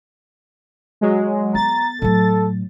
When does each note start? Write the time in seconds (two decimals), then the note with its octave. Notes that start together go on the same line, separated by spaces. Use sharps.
1.01 F#3 G#3
1.55 B3 A#5 A6
2.02 A2 F#3 A4